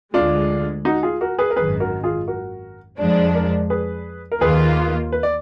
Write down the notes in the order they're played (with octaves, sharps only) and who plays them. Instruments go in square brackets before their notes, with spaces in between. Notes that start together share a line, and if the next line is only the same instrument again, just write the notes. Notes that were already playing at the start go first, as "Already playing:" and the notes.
[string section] D2 D3 G#3 [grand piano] D4 F4
[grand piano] D#4 F#4
F4 G#4
F#4 A#4
G#4 B4
A#4
[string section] G#1 F#2 D#3 [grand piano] G#4 B4
[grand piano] F#4 A#4
F4 G#4
F#4 A#4
[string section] F2 F3 G#3 D4
[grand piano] A#4 D5
G#4 B4
A#4
[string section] D#2 D#3 A#3 F4 [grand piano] G#4 B4
[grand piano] B4
D5